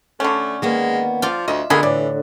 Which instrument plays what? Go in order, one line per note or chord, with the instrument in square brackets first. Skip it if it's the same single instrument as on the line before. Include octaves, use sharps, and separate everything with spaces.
[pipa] D3 C#4 [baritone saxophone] A3
[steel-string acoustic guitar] D#3 A#3 B3 [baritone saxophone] G#3
[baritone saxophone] F3 [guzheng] F4 D5
[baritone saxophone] D2 [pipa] D#5 [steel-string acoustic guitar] E5
[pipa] B2 G#4 B5 [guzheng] D3 [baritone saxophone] A#3
[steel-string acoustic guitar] A2 [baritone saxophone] E3 [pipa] D5